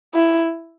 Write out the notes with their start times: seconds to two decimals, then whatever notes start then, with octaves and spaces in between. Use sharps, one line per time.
0.14 E4